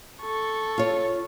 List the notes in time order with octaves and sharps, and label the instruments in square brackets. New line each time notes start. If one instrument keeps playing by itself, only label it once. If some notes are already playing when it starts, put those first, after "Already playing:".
[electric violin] A4 C#6
[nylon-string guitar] F4 C#5